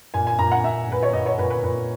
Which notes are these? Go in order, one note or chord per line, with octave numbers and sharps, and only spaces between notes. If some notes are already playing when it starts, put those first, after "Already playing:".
A#2 G#5
G#5
A#2 A#5
F#5
A#2 E5
A#2 B4
C#5
A#2 D#5
C#5
A#2 B4
B4
A#2 B4